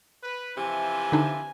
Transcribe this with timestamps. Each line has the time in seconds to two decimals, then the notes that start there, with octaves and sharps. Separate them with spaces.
0.23 B4
0.57 C3 E3 F3 G#5
1.12 D3 D4 D#4